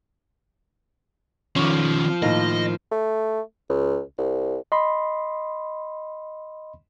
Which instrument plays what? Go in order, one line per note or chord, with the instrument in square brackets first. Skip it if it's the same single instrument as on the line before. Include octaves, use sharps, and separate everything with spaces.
[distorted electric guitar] D#3 C#4 [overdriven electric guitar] F3 [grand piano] C#6 D6
[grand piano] A2 D#3 A#3 [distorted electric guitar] D#5
[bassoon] A3
C#2
C2
[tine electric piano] D#5 B5 C6